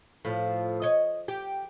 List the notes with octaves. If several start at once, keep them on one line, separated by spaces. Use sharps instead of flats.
A2 F3
C#5 D#5
G4